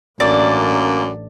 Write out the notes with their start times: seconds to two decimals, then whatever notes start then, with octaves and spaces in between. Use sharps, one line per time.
0.20 A1 F#2 A#3 D4 D5